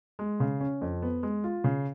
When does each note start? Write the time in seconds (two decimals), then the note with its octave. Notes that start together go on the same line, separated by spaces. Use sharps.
0.19 G#3
0.40 C#3
0.61 C#4
0.82 F2
1.02 B3
1.23 G#3
1.44 F4
1.64 C#3